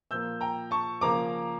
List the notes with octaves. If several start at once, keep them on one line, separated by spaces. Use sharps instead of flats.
A#2 F3 A#3 E6 G6
G5 A#5
A5 C#6
C#3 F3 A#3 C#4 A#5 D6